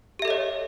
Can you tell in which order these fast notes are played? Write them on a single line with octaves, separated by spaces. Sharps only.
G4 E5 A4 D#5 C#5